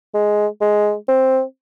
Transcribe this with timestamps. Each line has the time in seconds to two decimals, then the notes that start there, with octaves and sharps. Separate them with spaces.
0.14 G#3
0.61 G#3
1.09 C4